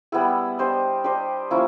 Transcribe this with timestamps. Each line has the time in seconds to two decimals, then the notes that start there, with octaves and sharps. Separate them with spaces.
0.12 G3 B3 E4 G#4
0.59 D4 G4 C5 D#5
1.04 D4 G4 C5 D#5
1.51 F3 A#3 C#4 E4